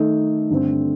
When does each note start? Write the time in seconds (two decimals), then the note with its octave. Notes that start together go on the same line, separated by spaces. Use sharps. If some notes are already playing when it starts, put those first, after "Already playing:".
Already playing: D#3 A3 D#4 A4
0.50 G2 D3 A3 C4